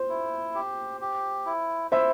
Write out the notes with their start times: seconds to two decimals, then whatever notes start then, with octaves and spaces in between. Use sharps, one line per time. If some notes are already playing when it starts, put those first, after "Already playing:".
Already playing: C5
0.09 E4
0.55 G4
1.01 G4
1.46 E4
1.91 E4 C5 E5